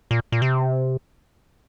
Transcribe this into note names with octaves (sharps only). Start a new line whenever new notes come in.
A#2
A#2
C3